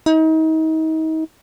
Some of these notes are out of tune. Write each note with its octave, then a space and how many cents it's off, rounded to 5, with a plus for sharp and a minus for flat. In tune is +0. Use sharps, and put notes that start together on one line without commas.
D#4 +35